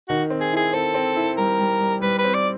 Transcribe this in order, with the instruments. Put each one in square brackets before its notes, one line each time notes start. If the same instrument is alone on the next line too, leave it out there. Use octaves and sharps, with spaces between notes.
[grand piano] D#3 [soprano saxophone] F#4
[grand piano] C4
[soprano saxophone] G#4
[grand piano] E4 [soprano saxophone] G#4
[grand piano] C4 [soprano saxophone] A4
[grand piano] C4
E4
[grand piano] G3 [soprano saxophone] A#4
[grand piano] G3
G3
[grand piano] G3 [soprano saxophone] B4
[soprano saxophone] B4
[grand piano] C4
[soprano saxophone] D5